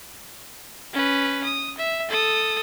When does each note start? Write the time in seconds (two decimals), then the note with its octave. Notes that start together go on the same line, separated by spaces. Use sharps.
0.93 C#4 B4
1.44 D#6
1.78 E5
2.09 A4 D#6